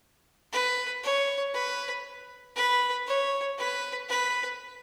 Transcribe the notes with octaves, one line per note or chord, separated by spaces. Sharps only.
B4
C#5
B4
B4
C#5
B4
B4